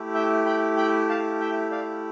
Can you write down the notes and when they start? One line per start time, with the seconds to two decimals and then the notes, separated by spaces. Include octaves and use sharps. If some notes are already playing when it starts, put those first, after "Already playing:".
Already playing: A3 E4 G4
0.14 E5 G5
0.46 G5 B5
0.77 G5 B5
1.09 F5 A5
1.41 E5 G5
1.71 D5 F5